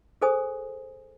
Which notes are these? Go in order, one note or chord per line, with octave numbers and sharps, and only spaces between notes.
G#4 A4 C5 G#5 D#6